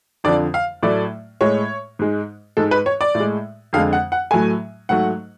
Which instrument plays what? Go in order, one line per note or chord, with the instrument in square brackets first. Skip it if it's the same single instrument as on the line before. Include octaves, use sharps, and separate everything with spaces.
[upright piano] F2 D3 F3 D5
F5
A2 F#3 A3 D5
A2 G#3 C#5
G#2 G#3
G#2 G#3 A4
B4
C#5
D5
A2
G#3
F2 D3 G#3 F5
F#5
F#5
A2 F#3 A3 G#5
G#2 F#3 A3 F#5